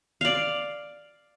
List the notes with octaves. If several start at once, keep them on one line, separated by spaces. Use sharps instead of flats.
D5 F5